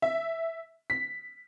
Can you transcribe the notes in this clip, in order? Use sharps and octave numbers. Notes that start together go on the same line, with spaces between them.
E5
B6